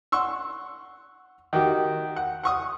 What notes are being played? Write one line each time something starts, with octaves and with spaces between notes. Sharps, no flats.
F#5 C6 C#6 E6
D#3 F#4 G4
F#5
F#5 C#6 D#6